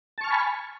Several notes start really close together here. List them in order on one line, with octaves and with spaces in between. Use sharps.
A5 C#6 F6 G#5 B5